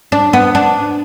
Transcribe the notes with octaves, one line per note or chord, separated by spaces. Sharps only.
D4
B3
D4